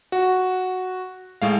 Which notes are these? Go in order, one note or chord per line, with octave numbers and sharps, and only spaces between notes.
F#4
A2 G#3 F5